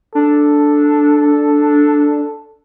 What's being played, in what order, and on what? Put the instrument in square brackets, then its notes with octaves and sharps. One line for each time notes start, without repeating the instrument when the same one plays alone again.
[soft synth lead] D4 [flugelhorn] A4